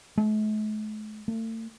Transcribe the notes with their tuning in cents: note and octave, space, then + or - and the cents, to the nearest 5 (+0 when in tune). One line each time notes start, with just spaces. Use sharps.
A3 -45
A3 +40